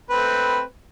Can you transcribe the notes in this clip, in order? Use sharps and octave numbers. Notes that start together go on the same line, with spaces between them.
A3 C4 B4